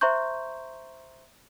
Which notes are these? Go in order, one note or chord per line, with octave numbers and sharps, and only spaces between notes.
C5 E5 A#5 C6 C#6 G6